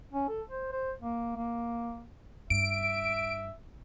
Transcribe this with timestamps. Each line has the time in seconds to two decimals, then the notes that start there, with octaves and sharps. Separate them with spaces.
0.13 C#4
0.28 A4
0.49 C5
0.72 C5
1.02 A#3
1.36 A#3
2.50 G2 E5 D7